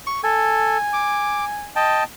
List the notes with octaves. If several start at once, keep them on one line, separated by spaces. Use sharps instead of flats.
C#6
A4 G#5
D6
D#5 G5 A5